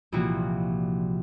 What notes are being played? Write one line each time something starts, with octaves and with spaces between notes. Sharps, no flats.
C2 A#2 E3 F3 A#3 F#4